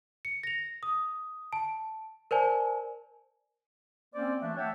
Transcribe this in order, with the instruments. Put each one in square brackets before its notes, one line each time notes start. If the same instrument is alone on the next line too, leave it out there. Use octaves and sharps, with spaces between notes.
[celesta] C#7
A#6 F7
D#6
A5
A#4 C5 D5 G#5 A5
[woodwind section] A#3 C4 C#4 C5 D5
E3 A3 A#3 D4 F#4 E5
C#5 E5 F#5 G5 A5